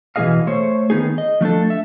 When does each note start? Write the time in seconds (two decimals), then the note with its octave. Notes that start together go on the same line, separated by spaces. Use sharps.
0.16 B2 E3 A#3 G#4 D#5 F5
0.47 A3 C5 C#5
0.90 D#3 B3 D#4 G#4
1.18 D#5
1.41 F3 A3 D4 A4
1.70 E5